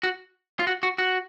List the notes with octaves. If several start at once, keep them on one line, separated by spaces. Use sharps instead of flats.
F#4
F4
F#4
F#4
F#4